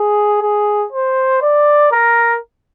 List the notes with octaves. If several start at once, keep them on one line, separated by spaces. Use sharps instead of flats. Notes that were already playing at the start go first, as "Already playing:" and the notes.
Already playing: G#4
G#4
C5
D5
A#4